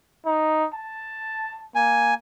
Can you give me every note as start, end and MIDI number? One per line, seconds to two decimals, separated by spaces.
0.26 0.66 63
0.74 1.65 81
1.75 2.14 58
1.75 2.14 80